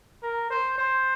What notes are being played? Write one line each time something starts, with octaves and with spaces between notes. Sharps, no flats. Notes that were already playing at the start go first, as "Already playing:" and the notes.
A#4
C5
C5